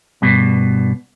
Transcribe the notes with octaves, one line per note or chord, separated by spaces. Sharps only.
G2 B2